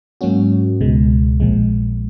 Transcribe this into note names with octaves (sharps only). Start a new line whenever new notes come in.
G#2 F#3 A#3 C#4 F#4
C#2 B2 G#3
A#1 A#2 F3 G#3